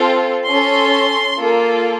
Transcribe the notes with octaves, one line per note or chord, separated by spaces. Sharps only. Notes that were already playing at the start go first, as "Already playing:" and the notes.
Already playing: C4 F4 A4
C#4 A4 C6
A#3 F4 A4